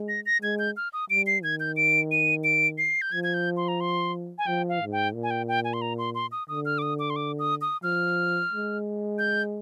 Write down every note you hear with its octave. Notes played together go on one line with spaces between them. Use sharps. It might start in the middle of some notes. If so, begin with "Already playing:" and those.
Already playing: G#3
A#6
A#6
G#3 G#6
G6
F6
D#6
G3 D7
C7
D#3 G#6
G6
D7
D#7
D7
C7
G6
F3 G#6
G#6
G6
C6
A#5
C6
G#5
F3 G5
F5
G#2
G5
A#2
G#5
G5
G5
G#5
C6
A#5
C6
C6
D#6
D3 D#6
F6
D6
D#6
D6
C6
D6
D#6
D#6
F3 F6
G#3
G6